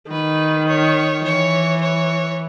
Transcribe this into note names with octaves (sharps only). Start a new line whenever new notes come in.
D#3 B4
C#5
E3 C#5
C#5